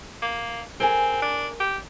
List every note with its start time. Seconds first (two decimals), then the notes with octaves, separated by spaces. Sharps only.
0.22 A#3
0.80 C4 G#4 A#4 G#5
1.22 D4
1.60 G4